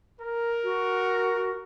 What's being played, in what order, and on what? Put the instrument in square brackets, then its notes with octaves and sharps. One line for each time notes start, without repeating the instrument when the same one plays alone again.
[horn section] A#4
[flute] F#4